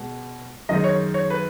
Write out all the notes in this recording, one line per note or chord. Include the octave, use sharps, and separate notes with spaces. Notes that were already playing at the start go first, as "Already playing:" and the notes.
Already playing: B2 G#3
F#2 D#3 G#3 D#5
C#5
C#5
B4